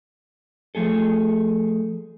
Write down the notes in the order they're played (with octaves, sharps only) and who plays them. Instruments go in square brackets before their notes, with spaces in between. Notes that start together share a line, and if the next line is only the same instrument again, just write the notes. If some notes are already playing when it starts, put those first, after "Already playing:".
[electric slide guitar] F3 A3 G#4 A4